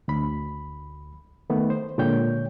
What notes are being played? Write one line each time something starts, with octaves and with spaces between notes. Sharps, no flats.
D2 B5
D#3 A3 B3
C5
A#2 D3 G#3 C#5 G5 G6